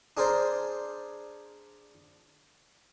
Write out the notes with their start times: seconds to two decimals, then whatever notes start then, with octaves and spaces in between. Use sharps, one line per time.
0.17 D4 G#4 A#4 C5 D5